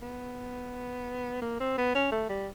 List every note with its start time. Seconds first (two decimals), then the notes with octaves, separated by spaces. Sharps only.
0.02 B3
1.42 A#3
1.60 C4
1.77 B3
1.95 C#4
2.12 A3
2.29 G3